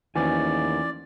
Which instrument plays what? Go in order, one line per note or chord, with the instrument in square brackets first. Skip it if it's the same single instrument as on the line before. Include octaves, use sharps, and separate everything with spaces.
[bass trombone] D#2 [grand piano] E3 F3 C#4 [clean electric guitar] A3 B3 G#5 [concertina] D5